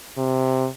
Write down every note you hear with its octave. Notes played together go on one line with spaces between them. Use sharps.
C3